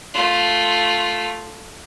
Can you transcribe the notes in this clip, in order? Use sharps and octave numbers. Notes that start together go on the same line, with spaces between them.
A3 F4